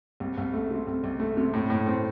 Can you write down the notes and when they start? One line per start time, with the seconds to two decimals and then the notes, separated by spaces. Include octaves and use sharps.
0.20 C2
0.38 C2
0.54 A3
0.71 C3
0.87 C2
1.04 C2
1.20 A3
1.37 C3
1.54 A2
1.70 A2
1.86 C4